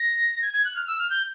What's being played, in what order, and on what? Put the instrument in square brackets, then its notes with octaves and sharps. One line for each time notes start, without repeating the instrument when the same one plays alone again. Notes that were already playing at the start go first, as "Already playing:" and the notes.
Already playing: [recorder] A#6
G#6
G#6
F#6
F6
E6
F6
G6